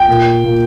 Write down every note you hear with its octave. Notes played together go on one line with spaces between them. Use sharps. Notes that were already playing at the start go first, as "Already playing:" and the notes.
Already playing: G5
A#2
A#2